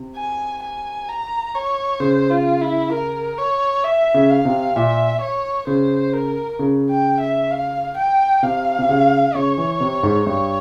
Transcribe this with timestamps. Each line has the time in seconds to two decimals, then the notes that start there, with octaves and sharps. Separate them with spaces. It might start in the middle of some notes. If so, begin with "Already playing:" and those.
Already playing: C3
0.16 G#5
0.62 G#5
1.09 A#5
1.54 C#5
2.00 C#3 C5
2.30 F4
2.61 E4
2.92 A#4
3.38 C#5
3.84 E5
4.14 C#3
4.30 F5
4.45 C3
4.76 A#2 E5
5.21 C#5
5.67 C#3 C5
6.13 A#4
6.59 C#3
6.90 G5
7.20 E5
7.51 F5
7.97 G5
8.43 C3 F5
8.79 C3
8.89 C#3
9.35 C#3 C#5
9.58 E3
9.80 C3
10.03 G#2
10.26 G2 C#5